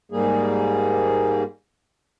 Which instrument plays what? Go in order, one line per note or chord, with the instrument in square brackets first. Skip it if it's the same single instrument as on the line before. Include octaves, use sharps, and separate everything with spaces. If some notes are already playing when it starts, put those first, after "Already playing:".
[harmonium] G#2 G3 A#3 G#4